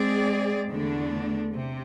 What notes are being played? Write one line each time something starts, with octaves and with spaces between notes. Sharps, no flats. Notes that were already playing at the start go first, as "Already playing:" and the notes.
Already playing: G#3 C4 G#4 D5
E2 D3 A3 D4
C3